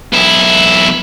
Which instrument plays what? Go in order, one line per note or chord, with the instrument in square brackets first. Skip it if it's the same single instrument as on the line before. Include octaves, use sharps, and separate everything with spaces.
[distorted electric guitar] B1 E4